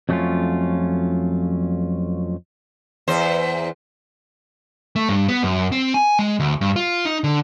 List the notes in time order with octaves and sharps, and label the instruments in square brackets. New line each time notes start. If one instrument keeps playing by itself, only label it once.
[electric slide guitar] F2 F#3 A3 C4 C#4 F4
[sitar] E2 C5
[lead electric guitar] A3
G2
B3
F#2
C4
G#5
G#3
D2
G2
F4
D#4
D3